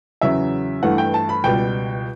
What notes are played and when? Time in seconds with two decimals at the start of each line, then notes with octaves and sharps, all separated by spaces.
0.21 E2 C#3 F#3 E5
0.83 G2 E3 A3 F#5
0.98 G5
1.14 A5
1.29 B5
1.44 C#2 B2 G3 G5